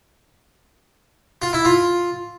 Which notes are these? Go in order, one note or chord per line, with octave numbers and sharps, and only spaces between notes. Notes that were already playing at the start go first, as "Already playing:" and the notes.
F4
E4
F4